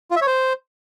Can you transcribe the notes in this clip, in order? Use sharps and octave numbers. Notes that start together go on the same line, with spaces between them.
F4
E5
C#5
C5